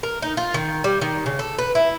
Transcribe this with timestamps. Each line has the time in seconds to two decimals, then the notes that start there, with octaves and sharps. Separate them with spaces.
0.03 A#4
0.22 D#4
0.37 F4
0.54 D#3
0.84 G3
1.02 D#3
1.26 C#3
1.39 A4
1.59 B4
1.75 E4